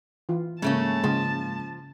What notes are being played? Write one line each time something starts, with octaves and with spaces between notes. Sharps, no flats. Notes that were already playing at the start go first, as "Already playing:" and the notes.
E3 F4
G#2 C#3 A3 A#3 C#4 A5
C#3 F3 G#3